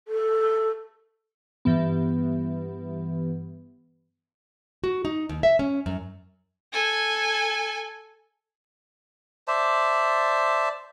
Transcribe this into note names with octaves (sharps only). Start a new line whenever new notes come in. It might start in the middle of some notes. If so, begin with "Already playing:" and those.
A4
G2 E3 B3
F#4
D#4
D#2
E5
C#4
F#2
A4 G#5
C5 D5 E5 A5